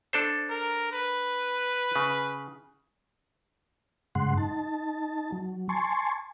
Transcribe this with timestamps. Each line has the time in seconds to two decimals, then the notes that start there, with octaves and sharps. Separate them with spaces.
0.13 D4 A4 C5
0.50 A#4
0.92 B4
1.96 C#3
4.15 G2 C#3 G#3 F#5 C6
4.37 D#4 A5
5.32 F#3
5.69 G#5 A5 C6 C#6